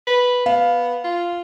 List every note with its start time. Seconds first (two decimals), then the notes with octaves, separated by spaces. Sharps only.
0.07 B4
0.46 B3 F5
1.05 F4